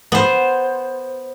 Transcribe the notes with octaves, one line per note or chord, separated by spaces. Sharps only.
B3 C5